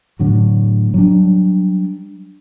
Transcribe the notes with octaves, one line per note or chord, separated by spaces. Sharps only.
A2 D3 F#3
F#3 G3 D4